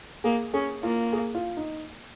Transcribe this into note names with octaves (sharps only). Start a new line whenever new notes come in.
A#3 G#4
C#4 G#4
A#3 F4
G#4
F4
D#4